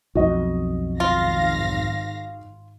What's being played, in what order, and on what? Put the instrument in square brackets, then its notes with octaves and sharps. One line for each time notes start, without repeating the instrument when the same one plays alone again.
[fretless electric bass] B1 F2 [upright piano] F#4 D#5
[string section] G#1 F5 A#6 [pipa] F4